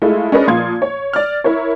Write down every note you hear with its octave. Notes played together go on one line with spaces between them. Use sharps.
G#3 A3 E4 F4
C#4 D4 G#4 A#4 B4 D#5
A#2 F3 F5 C6 D#6 G#6
C#5
D5 F6
E4 A#4 C#5